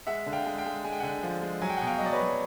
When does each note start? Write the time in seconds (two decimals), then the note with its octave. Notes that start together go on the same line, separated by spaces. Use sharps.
0.07 G#3 E5 F#5
0.26 D3
0.32 F5 G5
0.45 G#3
0.58 F5 G5
0.65 G#3
0.84 G#3 G#5
0.93 G5
1.00 D3 F#5 G#5
1.23 F3
1.42 G#3
1.62 F#3 G#5
1.70 G5
1.77 B2 F#5 G#5
1.87 F5 G5
1.98 F#3 D#5
2.06 D5
2.13 B4 C#5
2.20 F#3